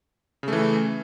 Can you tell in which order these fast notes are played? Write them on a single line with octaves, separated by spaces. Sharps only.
C#3 A3 E3